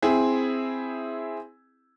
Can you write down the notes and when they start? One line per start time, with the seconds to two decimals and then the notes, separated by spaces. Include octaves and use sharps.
0.02 C4 E4 G#4